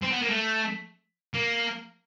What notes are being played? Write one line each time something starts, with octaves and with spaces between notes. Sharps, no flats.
C4
B3
A#3
A3
A#3